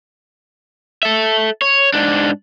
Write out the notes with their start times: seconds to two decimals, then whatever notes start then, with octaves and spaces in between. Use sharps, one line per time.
1.03 A4 E5
1.62 C#5
1.93 G#2 D4